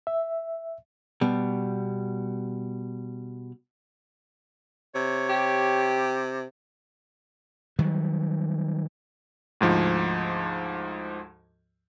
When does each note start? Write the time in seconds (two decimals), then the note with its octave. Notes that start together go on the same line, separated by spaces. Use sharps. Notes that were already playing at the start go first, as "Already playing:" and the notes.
0.07 E5
1.21 B2 G3
4.95 C3 C#5
5.29 G4
7.79 D#3 F#3 G3
9.61 D2 G#2 F3